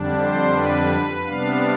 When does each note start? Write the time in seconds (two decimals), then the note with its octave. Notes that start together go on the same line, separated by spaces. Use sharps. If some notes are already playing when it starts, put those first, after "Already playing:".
Already playing: F2 D3 G3 D4
0.19 C5
0.54 B4
1.25 C3 G3 B3 D4 F5